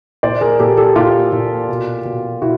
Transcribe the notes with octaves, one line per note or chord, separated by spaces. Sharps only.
A#2 C5 D5
G#4 A#4
A#2 G4 A4
G4 A4
A#2 F4 G4
A#2
B2
B2
B2 E4 F#4